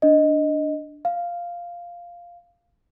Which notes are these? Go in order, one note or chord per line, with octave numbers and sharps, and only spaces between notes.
D4 D#5
F5